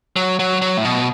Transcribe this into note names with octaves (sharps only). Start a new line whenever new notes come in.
F#3
F#3
F#3
A2
B2